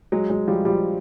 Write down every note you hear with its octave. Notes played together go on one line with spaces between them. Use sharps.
F#3 G#3
F#3 G#3
F3 G3
F3 G3